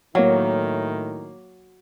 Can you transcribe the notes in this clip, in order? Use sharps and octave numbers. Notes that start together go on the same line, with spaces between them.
A2 D#3 F#3 A#3 E4 C#5 F5